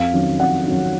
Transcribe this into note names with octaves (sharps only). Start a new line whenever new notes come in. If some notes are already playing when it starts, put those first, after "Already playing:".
Already playing: F2 F5
D#3 F#3 C#4
F2 F#5
D#3 F#3 C#4